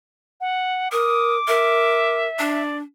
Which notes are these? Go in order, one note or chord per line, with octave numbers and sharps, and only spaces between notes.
F#5
A#4 D6 D#6
A#4 E5
D4 D5